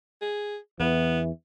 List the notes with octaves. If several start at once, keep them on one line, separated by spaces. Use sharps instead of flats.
G#4
E2 E3 B3